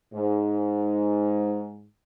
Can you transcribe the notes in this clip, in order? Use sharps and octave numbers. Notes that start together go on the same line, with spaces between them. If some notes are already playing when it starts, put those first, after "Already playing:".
G#2